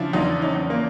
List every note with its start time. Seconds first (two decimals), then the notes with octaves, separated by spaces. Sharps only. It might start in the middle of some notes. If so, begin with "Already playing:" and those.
Already playing: C#3 F3 D4 E4
0.13 E2 D#4 F4
0.42 C#4 D#4
0.56 E2
0.70 A#3